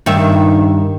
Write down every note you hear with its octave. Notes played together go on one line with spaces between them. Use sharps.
G2 D#3 E5